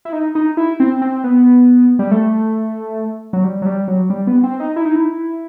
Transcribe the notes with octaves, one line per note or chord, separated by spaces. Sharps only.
E4
D#4
D#4
E4
C4
C4
B3
G3
A3
F#3
G3
F#3
G3
F#3
G3
B3
C4
D#4
E4
D#4
E4